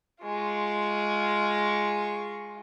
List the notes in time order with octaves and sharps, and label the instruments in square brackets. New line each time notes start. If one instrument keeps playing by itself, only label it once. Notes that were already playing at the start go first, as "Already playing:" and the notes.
[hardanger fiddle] G#3 F4 [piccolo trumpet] C#6